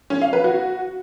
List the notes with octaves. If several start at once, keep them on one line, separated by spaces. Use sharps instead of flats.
C#4
F5
B4
F#4